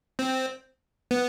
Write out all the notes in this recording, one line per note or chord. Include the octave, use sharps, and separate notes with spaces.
C4
B3